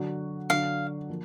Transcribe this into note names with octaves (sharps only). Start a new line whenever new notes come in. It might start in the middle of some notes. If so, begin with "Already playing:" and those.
Already playing: D3 F#3 D4 F#4
D3 F#3 D4 F#4 F5
F3 A#3